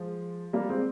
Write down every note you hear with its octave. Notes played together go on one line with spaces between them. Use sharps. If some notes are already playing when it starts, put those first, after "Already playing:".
Already playing: F3 G#3
G3 A#3
G#3 C4